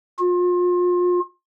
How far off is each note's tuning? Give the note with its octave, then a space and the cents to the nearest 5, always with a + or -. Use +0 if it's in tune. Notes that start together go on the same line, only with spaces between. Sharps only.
F4 +35